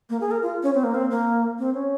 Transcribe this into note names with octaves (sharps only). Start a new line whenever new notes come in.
A#3
G#4
A#4
F4
C#4
C4
A#3
C4
A#3
C4
C#4